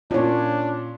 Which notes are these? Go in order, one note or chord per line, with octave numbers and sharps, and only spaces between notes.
A#2 C#4 D4 F4 C#5